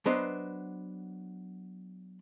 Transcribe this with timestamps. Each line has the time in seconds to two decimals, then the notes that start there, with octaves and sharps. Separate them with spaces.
0.06 F#3 B3 D4 B4 C5 D#5